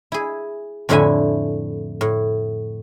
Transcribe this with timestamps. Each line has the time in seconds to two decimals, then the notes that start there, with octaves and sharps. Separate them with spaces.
0.12 E4 G#4
0.89 F2 A2 D3 E4 E5 G#5
2.01 A2